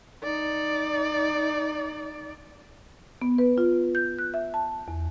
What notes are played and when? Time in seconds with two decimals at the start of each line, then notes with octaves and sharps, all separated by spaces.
0.23 D#4 D5
3.22 B3
3.38 B4
3.58 F4
3.95 G6
4.19 F#6
4.34 E5
4.54 A5
4.88 E2